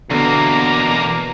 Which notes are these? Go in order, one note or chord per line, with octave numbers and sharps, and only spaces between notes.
E2 B2 D3 A#3 B3 A#5